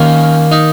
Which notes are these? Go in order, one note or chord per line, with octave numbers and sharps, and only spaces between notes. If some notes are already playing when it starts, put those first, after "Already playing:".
Already playing: D#3 A#3 C#4
D#4